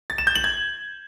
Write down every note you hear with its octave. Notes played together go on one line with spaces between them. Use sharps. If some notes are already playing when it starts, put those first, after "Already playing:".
A6
E7
G6
F#7
G#6